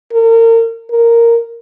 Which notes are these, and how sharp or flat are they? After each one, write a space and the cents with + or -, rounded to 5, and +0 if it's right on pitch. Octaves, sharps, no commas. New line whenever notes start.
A#4 -35
A#4 -5